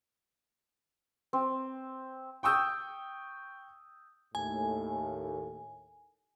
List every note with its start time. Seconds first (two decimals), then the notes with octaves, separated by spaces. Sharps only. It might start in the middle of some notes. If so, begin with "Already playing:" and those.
1.33 C4
2.43 G5 C#6 D#6 E6 G6
4.35 D#2 A2 G#5